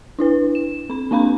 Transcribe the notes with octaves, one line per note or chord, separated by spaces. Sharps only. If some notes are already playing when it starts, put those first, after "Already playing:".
D4 E4 B4
E7
C4 B5
A#3 C4 D4 F5 A#5 B5